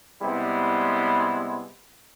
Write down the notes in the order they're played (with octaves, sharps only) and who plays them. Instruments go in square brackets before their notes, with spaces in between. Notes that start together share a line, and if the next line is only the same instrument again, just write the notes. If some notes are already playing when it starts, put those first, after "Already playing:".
[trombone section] C3 G3 G#3 B3 E4